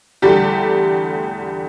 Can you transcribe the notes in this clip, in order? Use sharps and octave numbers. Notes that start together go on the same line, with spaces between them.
E2 D3 G3 A3 G4